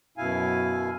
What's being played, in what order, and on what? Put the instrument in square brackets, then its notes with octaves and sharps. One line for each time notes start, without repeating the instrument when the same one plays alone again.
[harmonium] F#2 B2 E4 F5 G#5